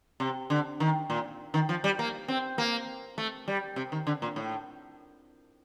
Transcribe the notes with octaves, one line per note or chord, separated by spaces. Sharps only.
C3
D3
D#3
A#2
D#3
F3
G3
A#3
C4
A#3
A3
G3
C3
D#3
D3
A#2
A2